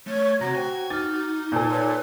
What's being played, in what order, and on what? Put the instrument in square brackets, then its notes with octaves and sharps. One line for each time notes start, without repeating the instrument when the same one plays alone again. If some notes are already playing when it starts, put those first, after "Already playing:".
[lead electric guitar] A3 [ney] C#5
[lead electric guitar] C3 [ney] F#4 [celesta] C#5 A#5 A#6
[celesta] C5 G5 [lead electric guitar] G#5
[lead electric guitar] D#4 [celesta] D6 F6 [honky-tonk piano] A6
[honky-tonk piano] A#2 A4
[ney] B4 [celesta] C#5 E6